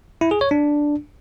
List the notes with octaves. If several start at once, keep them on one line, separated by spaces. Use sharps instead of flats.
E4
G#4
C#5
D4